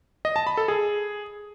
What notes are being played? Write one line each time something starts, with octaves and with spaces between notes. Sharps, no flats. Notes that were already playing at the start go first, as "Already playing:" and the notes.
D#5
A5
B5
A4
G#4